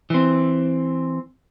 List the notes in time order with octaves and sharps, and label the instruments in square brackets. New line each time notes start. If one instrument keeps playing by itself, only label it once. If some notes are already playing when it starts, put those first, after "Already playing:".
[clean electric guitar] E3 C4